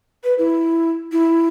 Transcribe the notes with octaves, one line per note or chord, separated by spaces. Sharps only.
B4
E4
E4